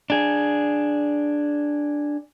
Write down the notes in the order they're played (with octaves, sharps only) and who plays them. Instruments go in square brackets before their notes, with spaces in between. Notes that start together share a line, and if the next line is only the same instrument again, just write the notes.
[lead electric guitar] D4 G#4